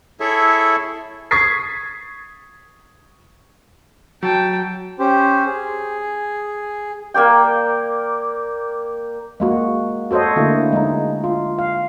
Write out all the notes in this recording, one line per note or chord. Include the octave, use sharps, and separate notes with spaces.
E4 G#4 A4 C#5 E5
C#6 D#6 G#6 A6 B6 C7
F#3 G5 A5
C#4 G4 C5
G#4
A#3 A#4 D5 G5
G#3 A#3 F#4
F#4 A4 C5 C#5 D#5
D3 A3 A#3 E4
G#3 D#4
F4
F5